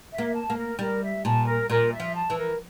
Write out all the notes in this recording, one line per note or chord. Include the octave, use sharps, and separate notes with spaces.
E5
A#3
A5
A#3
A#4
G3 A#4
E5
A#2 A5
A#4
A#2 A#4
E5
F3
A5
E3
A#4